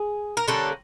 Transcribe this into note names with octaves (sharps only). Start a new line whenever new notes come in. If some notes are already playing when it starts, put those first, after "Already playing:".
Already playing: G#4
A#4
D3 G3 A#3 C#4 A4